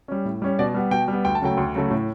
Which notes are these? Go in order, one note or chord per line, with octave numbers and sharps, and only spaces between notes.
G3 C#4
A2
G3 C#4
B2 D5
G3 B3
B2 G5
G3 B3
D2 G5
A5
C#3 F#3 A3 G5
D2
C#3 F#3 A3
A2